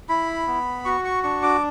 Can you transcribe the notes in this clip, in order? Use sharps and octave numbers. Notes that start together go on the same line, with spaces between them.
E4 B5
B3
F#4 C#6
C#6
D4 C#6
D6